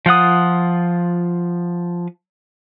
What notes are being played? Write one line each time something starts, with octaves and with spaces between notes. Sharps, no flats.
F3 F4 F#5 D#6